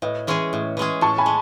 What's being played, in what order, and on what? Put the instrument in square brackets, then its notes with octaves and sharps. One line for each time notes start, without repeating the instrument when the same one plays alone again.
[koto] A2 [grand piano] B4 D#5
[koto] E3 G#3 C#4 G#4
A2
E3 G#3 C#4 G#4
[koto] A2 [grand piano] A5 C#6
[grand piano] G#5 B5
[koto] G#3